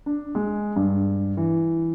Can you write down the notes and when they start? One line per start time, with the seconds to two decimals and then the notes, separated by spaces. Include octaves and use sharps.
0.06 D4
0.35 G#3
0.76 G2
1.37 E3